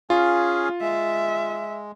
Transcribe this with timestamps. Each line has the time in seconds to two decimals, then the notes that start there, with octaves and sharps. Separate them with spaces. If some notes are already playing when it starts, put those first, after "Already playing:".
0.10 C#4 F4 G#4 F5
0.81 G#3 E5